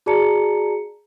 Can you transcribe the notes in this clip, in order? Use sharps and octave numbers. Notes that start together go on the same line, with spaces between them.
F#4 G#4 D5 A5 A#5 C#7